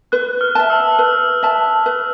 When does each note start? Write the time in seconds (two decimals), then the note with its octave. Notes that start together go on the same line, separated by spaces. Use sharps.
0.12 B4 F#6
0.41 F6
0.55 E5 A5
0.70 E6
0.99 B4
1.43 E5 A5
1.86 B4